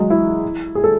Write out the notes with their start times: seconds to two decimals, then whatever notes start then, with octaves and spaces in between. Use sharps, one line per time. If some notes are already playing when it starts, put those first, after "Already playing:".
Already playing: F#3 G#3
0.10 E4
0.75 G#4
0.84 A4